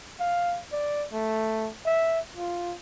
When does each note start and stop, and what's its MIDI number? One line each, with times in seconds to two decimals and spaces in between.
0.20 0.60 77
0.72 1.06 74
1.12 1.70 57
1.85 2.20 76
2.36 2.75 65